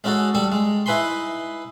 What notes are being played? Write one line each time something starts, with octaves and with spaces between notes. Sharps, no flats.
G#3 C#4 D#4 F#4 A4
G3 A4 A5 C#6
G#3
D#4 E4 B4 G#5 B5 C6